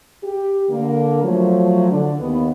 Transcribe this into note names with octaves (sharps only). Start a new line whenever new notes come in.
G4
D3 A#3
F3 F#3 A3
D3 D4
D#2 B3